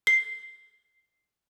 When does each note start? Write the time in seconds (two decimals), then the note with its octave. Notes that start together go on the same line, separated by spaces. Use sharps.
0.07 C7